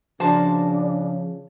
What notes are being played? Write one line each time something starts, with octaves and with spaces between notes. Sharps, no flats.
C#3 F3 D4 F#4 C5 A5